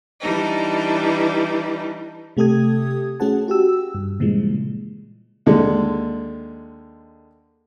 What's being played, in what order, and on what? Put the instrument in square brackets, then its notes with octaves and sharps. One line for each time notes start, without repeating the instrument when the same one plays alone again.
[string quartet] E3 G3 D4 D#4
[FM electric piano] C3 A3 G4 A4 D#6 G#6
A3 C#4 F#4 G#4 F#5 A5
F#4 G4 E6
G2
A#2 C#3 E3 F3 G3 G#3
[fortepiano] D#2 D3 G#3